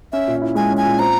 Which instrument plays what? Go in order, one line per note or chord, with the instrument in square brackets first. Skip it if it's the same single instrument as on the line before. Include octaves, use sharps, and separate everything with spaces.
[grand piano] C#4 [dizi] E5
[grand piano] A#2
E4
[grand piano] G#3 [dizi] G#5
[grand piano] C#4
[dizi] G#5
[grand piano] A#2
[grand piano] C4 [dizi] A#5